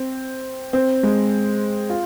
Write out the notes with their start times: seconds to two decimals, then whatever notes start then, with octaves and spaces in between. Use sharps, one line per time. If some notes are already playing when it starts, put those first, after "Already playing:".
Already playing: C4
0.73 C4
1.03 G#3
1.90 F4